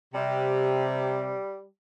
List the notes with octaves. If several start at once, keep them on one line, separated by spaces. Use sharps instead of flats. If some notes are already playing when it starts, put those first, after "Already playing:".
C3 G3